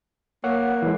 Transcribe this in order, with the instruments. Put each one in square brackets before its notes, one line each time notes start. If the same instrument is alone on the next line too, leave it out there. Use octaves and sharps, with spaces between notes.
[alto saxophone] A#3 [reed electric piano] C#5 F#5
[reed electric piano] E3 G#3